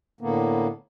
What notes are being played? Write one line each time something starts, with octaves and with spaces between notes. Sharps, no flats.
A2 D3 A#3 B3